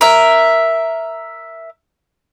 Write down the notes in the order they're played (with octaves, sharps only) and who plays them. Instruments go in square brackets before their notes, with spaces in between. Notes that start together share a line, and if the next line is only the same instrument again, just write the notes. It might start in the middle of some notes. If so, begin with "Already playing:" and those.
[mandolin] A#4 E5